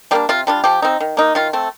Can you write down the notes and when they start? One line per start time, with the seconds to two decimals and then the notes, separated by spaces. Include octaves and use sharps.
0.11 G3 A#3 D4 G4
0.29 C3 F4
0.47 G3 D4 F4
0.64 F3 G4
0.82 C4 D#4
1.00 D#3
1.17 A#3 D#4
1.35 D#3 F4
1.53 A3 C4